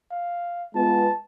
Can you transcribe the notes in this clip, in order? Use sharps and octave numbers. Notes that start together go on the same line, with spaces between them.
F5
G#3 B3 F4 A5